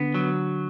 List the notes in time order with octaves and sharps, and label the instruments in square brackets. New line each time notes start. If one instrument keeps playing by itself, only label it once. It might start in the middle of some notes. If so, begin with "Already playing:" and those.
Already playing: [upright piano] D3 [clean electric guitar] B3
[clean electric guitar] F#3